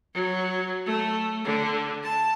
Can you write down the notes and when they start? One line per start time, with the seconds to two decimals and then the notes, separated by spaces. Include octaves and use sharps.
0.14 F#3
0.86 A3
1.45 D3
2.03 A5